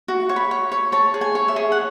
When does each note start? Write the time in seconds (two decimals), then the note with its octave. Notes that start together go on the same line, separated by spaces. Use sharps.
0.08 F#4
0.29 C#5 C#6
0.36 B5
0.51 C#5
0.72 C#5
0.92 C#5 A5
1.14 G#4
1.21 G#5
1.35 C#5
1.48 E5
1.56 G#4
1.72 F#5